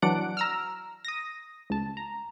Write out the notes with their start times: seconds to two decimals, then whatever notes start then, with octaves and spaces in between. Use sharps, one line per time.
0.02 E3 F#3 D4 F#5 D7
0.37 A#5 E6 F6
1.05 D#6 A#6
1.70 C#2 A5
1.97 A#5